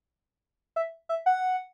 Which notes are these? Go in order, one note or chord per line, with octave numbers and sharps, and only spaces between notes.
E5
E5
F#5